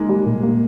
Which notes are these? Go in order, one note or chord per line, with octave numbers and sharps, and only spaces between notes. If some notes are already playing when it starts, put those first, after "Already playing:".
Already playing: G#3 A#3 D#4
G3
A#2
A#3